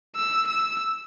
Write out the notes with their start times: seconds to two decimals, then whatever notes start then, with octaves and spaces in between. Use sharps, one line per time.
0.16 E6
0.47 E6